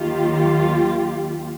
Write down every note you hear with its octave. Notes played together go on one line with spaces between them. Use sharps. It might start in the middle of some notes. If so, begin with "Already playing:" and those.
Already playing: D#2 D#3 F#3 F4 G4